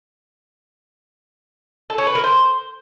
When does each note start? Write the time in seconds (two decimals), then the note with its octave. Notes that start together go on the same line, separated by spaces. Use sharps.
1.90 A4
1.98 C#4
2.07 B4
2.15 A#4
2.24 C5